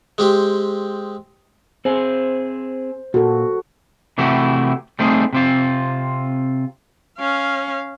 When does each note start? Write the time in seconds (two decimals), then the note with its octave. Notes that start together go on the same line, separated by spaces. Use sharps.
0.18 G#3 C4 G4
1.85 C4 G#4 C5
3.14 A#2 F#4 A4
4.18 C3 E3 A3 E4 F#4 G4
4.99 G3 A3 C4 D#4 G#4
5.33 C3 C4 F4
7.18 C#4 F5